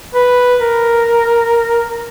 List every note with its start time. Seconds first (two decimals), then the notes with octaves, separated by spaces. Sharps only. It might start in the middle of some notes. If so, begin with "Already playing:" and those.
0.15 B4
0.60 A#4